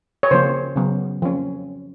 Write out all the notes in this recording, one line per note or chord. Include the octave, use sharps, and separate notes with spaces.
C#5
C#3 F3 A#3 C5
C#3 F#3 B3
F3 A#3 C#4